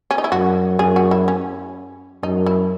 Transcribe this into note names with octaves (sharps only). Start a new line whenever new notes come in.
C#4
D#4
E4
F#2 F#4
F#2 G#4
F#4
E4
C#4
F#2 D#4
E4